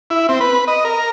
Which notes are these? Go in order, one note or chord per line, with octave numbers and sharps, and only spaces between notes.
E4
C4
B4
D#5
A#4